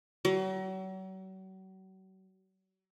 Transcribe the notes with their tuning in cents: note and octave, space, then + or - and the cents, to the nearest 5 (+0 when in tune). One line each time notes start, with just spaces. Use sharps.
F#3 +40